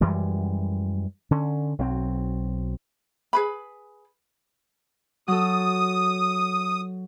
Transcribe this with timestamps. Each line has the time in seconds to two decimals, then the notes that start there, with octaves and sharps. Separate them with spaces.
0.01 F#2 E3 G3 G#3
1.31 D3 C#4
1.79 B1 F#3 C4
3.33 G#4 B4 B5
5.28 F#3 A4 D#6